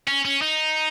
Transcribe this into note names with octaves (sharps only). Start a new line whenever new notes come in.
C#4
C#4
D#4